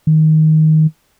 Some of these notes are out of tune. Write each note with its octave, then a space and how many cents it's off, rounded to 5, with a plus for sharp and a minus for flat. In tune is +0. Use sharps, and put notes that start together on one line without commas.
D#3 +10